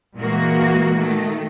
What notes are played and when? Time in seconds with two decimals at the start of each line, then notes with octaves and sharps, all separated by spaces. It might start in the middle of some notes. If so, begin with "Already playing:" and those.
0.17 A#2 E3 G#3 A#3 F#4
0.98 D#3 A3